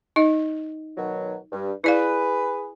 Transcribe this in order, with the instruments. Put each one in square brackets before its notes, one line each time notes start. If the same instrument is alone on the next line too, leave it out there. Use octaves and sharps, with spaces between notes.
[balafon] D#4 D#5
[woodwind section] B2 D#3 F#3
G2
[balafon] E4 D5 F5 [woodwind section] G#4 B4